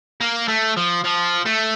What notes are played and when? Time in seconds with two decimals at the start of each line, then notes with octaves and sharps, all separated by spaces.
0.21 A#3
0.48 A3
0.77 F3
1.04 F3
1.45 A3